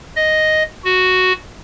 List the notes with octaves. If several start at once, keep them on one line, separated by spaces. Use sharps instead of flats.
D#5
F#4